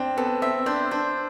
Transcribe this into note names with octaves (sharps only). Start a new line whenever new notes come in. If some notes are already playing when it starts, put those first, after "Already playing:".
Already playing: C4 D4
B3 A4
C4 E5
D4 C5
D4 C5